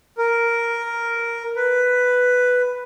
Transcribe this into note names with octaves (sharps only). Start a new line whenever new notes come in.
A#4
B4